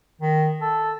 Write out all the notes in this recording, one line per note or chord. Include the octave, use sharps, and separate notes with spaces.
D#3
A4